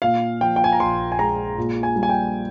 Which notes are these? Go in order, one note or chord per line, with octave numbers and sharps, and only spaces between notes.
A#2 F5
F3 G5
G5
G#5
A#5
A#1 C6
G#5
G#3 A#5
A#2
G#5
G3
G#5
G5